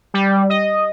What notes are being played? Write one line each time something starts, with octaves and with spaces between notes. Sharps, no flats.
G3
D#5